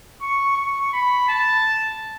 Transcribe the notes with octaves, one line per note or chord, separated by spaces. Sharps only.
C#6
C#6
B5
A5